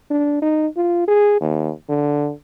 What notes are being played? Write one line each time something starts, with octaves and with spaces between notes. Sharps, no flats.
D4
D#4
F4
G#4
D#2
D3